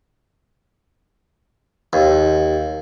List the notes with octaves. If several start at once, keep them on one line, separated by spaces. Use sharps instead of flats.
D#2